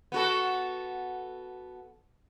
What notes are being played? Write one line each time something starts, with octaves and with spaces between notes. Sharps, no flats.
B3 F#4 A4